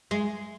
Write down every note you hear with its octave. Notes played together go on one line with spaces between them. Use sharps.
G#3